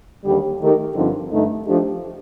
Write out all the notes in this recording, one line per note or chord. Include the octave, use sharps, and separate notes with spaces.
D#2 D3 G3
D#3 A3 D#4 G4 A#4
G2 D3 F3 C4 D#4
G2 D3 A3 D#4
F3 A3 D4 G4